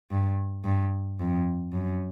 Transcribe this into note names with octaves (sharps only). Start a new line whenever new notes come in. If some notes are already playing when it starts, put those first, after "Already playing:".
G2
G2
F2
F#2